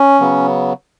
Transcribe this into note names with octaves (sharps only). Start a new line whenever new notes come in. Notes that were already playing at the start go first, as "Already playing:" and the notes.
Already playing: C#4
C#3 F#3 B3